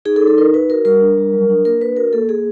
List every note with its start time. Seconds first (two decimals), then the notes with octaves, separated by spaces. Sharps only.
0.05 D#4 G#4
0.16 A4
0.21 D#4
0.27 A4
0.37 D#4 A#4
0.54 D#4 B4
0.69 F#4 A#4
0.85 G3 A#4
1.01 D4
1.18 G3
1.33 F#3
1.50 D4
1.65 A#3 A#4
1.81 D4 B4
1.97 F#4 A#4
2.13 A#3 A4
2.29 A#3 G#4